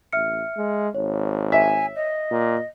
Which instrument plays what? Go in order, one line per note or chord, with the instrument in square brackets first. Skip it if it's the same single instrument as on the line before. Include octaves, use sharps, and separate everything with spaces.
[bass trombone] A1 [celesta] E5 F6 C#7
[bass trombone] G#3
[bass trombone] G#1 [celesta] C#5
[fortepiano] E5 [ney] G#5
[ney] D#5
[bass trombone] A#2